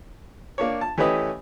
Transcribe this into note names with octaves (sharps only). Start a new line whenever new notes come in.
A#3 D4 C#5
A5
E3 A3 C#4 G4 B4 D#5